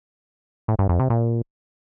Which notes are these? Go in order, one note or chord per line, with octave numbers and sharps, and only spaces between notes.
A2
G2
F2
C3
A#2